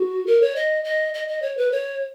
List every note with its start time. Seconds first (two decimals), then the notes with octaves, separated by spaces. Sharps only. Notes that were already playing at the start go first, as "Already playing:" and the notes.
Already playing: F#4
0.26 A#4
0.42 C#5
0.56 D#5
0.84 D#5
1.14 D#5
1.28 D#5
1.42 C#5
1.57 B4
1.72 C#5